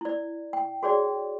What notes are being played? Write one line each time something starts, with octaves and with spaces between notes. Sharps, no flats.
E4 D5
G5
F#4 G#4 C#5 D5 G5